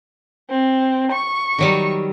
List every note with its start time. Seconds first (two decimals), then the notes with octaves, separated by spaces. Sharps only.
0.50 C4
1.12 C#6
1.58 D#3 F#3 G3